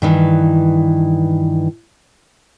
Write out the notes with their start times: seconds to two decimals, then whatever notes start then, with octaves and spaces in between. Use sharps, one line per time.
0.02 G2 D#3 E3